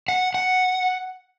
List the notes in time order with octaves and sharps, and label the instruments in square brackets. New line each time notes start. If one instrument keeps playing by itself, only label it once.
[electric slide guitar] F#5
F#5